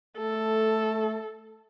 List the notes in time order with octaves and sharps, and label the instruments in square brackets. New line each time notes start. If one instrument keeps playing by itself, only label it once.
[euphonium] A3 [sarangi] A4